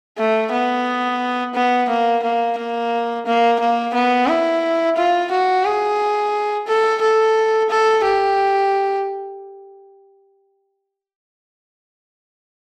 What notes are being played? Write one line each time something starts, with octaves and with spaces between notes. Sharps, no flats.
A3
B3
B3
A#3
A#3
A#3
A#3
A#3
B3
E4
F4
F#4
G#4
A4
A4
A4
G4